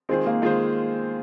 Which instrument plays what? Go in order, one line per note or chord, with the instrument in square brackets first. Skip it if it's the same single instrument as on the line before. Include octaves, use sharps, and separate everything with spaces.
[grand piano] D#3 G#3 F4 G#4 C5 [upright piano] C4
[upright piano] A#3
[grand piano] D#3 G#3 F4 G#4 C5